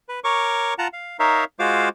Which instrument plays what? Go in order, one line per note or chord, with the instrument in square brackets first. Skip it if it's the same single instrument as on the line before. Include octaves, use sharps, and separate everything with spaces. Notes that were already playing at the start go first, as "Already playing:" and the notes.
[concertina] B4
A#4 C#5 C#6 D6
F4 F#5 A5 A#5
F5
D#4 A#4 C#5 E5 F5
G#3 F4 F#4 C5 F5 D6